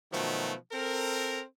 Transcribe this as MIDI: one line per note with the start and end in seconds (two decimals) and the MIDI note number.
0.13 0.53 47
0.13 0.53 51
0.13 0.53 53
0.13 0.53 54
0.13 0.53 57
0.72 1.41 60
0.72 1.41 69
0.72 1.41 70